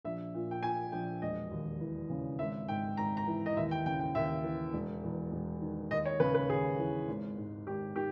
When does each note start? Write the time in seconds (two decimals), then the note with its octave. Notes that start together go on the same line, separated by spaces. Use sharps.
0.05 A#1 E5
0.34 A#2
0.51 G5
0.63 A#2 G#5
0.92 A#1 G5
1.22 E1 D#5
1.51 D#2
1.81 E3
2.10 C#3
2.39 G#1 E5
2.68 G#2 G5
2.97 G#1 A#5
3.17 A#5
3.27 E3
3.46 D#5
3.56 D#2 E5
3.71 G5
3.86 C#3 G5
4.00 G5
4.15 D#2 E5
4.44 E3
4.73 E1
5.03 E2
5.32 E1
5.62 D#3
5.90 D#2 D#5
6.05 C#5
6.20 C#3 B4
6.34 B4
6.49 D#2 G#4
6.78 E3
7.08 G#1
7.38 G#2
7.67 G#1 G4
7.96 D#3 G4